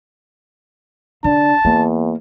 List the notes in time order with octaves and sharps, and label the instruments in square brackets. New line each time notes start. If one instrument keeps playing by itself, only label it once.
[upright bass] D3 [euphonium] D4 [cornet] A5
[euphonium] E2 [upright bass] A#3